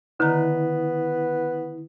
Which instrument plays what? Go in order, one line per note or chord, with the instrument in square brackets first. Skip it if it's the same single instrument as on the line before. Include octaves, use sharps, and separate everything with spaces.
[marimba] D3 D#3 A#5 [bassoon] B3 [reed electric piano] E4